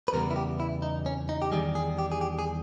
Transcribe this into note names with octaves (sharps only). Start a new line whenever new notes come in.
B4
E2 C#3 G3 B3 A#4
E4
G4
E4
D#4
C#4
D#4
G4
E2 D#3 G3 G#4
G#4
G4
G#4
G4
G#4